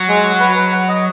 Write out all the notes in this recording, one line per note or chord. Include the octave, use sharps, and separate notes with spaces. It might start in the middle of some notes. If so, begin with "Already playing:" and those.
Already playing: F#3
G#3
F#4
B4
B4
F#5
D#5